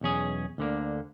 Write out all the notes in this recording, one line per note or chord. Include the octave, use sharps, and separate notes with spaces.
B1 E2 C#4 G#4
D2 D3 A#3